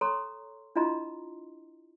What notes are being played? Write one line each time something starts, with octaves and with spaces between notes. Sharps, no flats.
A4 C#5 A#5 C6 C#6
D4 E4 F4 D#5 A#5 C6